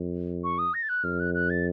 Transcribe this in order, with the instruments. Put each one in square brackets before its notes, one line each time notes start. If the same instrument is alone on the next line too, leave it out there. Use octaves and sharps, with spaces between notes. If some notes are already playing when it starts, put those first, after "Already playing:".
Already playing: [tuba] F2
[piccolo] C#6
D#6
A#6
A6
F#6
[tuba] F2 [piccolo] F6
[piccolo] F#6
F#6
A6